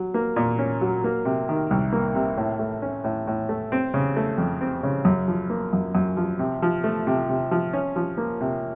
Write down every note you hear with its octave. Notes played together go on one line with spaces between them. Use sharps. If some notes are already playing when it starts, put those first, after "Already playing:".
Already playing: F#3
A#3
A#2
C#4
F#3
A#3
C3
D#3
C2
A#3
C3
A2
A3
C#4
A2
A2
A3
C4
C#3
A3
F2
C4
C#3
F#2
F3
A#3
F#2
F#2
F3
C3
F3
A3
C3
C3
F3
C#4
F3
A#3
C3